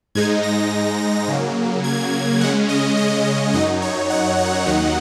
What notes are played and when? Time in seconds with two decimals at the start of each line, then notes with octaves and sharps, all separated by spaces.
0.15 G#2 G#3 D#4 G#6
0.43 A#6
1.28 C#3 F#3 A#3
1.84 G#6
2.40 C#3 G#3 C#4 F#5
2.69 D#5
2.97 D#5
3.25 D#5
3.53 F#2 F#3 D#4 D#5
3.82 C#5
4.10 F#5
4.38 F#5
4.66 D#2 D#3 F#3 D#4 F#5